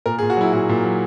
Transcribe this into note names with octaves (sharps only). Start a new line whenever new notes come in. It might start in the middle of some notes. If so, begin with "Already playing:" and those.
A#2 A#4
G#4
A#2
F#4
F#3 E4
A#2 F#4
A#2
F#3